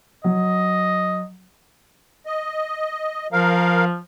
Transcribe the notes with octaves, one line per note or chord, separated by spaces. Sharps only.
F#3 D#5
D#5
F3 A#4 F5